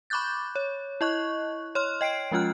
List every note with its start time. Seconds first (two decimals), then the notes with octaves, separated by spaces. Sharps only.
0.10 B5 C#6 D6 F#6 G6 A6
0.55 C#5
1.01 E4 D#5 C#6 F#6
1.75 C#5 C6 F6
2.01 D#5 G5 C7 D7
2.31 F3 G#3 C#4 F4 F6 F#6